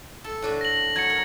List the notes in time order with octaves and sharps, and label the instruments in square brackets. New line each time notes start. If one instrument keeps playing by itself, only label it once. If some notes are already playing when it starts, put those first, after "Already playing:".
[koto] A4
A2 D4 F#4
[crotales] A#6 F#7
[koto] F#3 [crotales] G#6 C#7
[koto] A#4